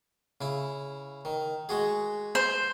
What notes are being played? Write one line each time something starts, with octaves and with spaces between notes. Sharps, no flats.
C#3 E4
D#3
G#3 F#4 G#4
C5